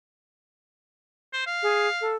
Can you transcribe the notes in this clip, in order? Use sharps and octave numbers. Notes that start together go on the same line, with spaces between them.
C5
F5
G#4
A4